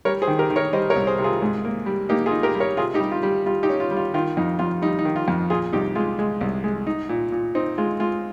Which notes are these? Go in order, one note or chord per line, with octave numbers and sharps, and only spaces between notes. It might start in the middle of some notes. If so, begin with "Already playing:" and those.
G3 A#4 C#5
G#4 C5
D#3
G4 A#4
D#3
A#4 C#5
G3 C5 D#5
A#4 C#5
C2
G#4 C5
C3
F4 G#4
G#2
A#3
G3
A#3 D#4 G4
F4 G#4
D#4
G4 A#4
G3
A#4 C#5
C3 F4 G#4
D#4 G4
G3
F4
G3
G3 F4
D#4 G4
C#4
F4
G3
F4
D#3 F4
F2 D#4
F2 F4
G3 D#4
D#4
D#3
F4
F2
A#2 F4 G#4
C2 D#4 G4
G#3 F4
G#3
C2
G#3
D#4
A#2
A#2
C4 D#4
G#3 F4
G#3 F4